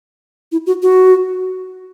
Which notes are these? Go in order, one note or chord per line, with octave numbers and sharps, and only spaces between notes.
E4
F#4
F#4